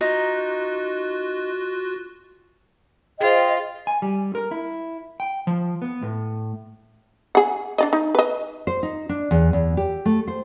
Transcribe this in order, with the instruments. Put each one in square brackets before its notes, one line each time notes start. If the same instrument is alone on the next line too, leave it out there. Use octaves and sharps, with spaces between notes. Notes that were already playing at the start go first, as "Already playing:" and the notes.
[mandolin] D#4 [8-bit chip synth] F4 F#4 F#6
[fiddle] F4 [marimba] G#4 C5 [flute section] D#5 G5
[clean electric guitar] G#5
G3
A#4
E4
G5
F3
B3
A2
[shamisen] G#4 F#5
D4 D5 D#5
D#4
B4 D#5
[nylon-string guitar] C5
D#4
D4
E2
E2
G4
A3
C5